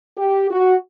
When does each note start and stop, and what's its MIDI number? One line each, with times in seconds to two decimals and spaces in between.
0.17 0.46 67
0.51 0.76 66